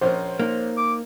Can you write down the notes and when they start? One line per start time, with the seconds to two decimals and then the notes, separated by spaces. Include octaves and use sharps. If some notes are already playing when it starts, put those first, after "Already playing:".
0.01 A#1 C#4 A#4 C5
0.40 A#3 D#4
0.77 D6